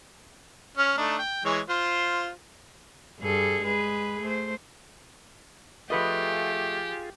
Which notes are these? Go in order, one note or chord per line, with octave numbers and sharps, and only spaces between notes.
C#4 F6
A3 D4 D#4
G5
E3 G#3 C#5
F4 C5
G2 G#4 A4
G#3 G#4 B4
A3 C5
F3 A3 F4 G4 G#4 B4 D#5